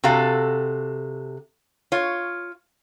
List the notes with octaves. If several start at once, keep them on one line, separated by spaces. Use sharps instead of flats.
C3 F#4 A4 F5
F4 C#5